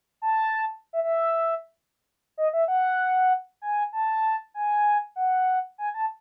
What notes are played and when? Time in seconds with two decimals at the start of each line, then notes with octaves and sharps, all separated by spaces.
0.22 A5
0.93 E5
1.04 E5
2.38 D#5
2.53 E5
2.68 F#5
3.62 G#5
3.93 A5
4.54 G#5
5.16 F#5
5.78 G#5
5.94 A5